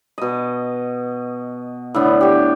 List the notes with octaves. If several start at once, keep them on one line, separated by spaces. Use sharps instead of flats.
B2 D#5
A2 D3 B3
G4 C#5